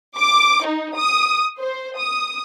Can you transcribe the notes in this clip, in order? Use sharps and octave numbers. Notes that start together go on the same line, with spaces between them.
D6
D#4
D#6
C5
D#6